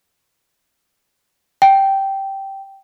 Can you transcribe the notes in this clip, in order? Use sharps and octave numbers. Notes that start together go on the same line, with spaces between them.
G5